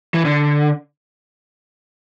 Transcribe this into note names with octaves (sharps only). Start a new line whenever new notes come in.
E3
D3